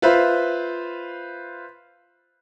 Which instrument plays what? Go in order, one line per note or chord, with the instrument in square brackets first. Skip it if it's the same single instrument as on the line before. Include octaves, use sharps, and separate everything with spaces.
[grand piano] F4 B4 C5 E5